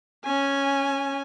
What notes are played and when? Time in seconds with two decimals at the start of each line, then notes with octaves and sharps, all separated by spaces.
0.24 C#4 G#5